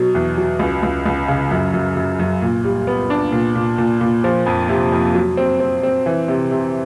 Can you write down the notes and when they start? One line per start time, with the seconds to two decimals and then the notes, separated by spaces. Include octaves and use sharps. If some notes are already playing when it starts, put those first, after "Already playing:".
Already playing: B2 F#3
0.15 E2
0.37 F#3
0.59 C#2
0.83 C#2
1.06 C#2
1.28 C#3
1.51 F#2
1.74 F#2
1.97 F#2
2.19 F#2
2.42 A#2
2.64 G3
2.87 B3
3.10 D4
3.32 A#2
3.55 A#2
3.78 A#2
4.01 A#2
4.24 F3
4.46 F2
4.69 C3
4.92 F2
5.15 F#3
5.37 C4
5.60 C4
5.83 C4
6.06 E3
6.28 C3
6.52 C3